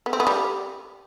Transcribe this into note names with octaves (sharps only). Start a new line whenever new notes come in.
B3
C4
B3
G3